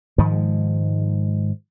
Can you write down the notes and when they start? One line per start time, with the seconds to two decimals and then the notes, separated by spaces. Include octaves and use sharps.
0.18 G#2 D#3 F3 G#3